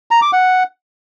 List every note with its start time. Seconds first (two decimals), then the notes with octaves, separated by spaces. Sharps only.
0.11 A#5
0.22 D6
0.33 F#5